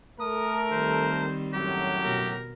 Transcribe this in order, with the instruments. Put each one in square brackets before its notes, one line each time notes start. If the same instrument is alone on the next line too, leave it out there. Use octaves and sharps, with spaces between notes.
[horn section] A3 A4 A#4 [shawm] D#6
[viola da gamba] D#3 G3 C4 [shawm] C5
[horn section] F#2 A2 F#3 [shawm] G4
[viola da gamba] B2 A#4